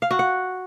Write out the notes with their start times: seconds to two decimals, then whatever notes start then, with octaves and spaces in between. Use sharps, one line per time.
0.02 F5
0.11 F#4
0.19 F#5